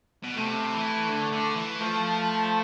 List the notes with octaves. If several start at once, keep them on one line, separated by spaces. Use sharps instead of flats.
B2
C3 A3
E3
D3
D3
E3
F3 A3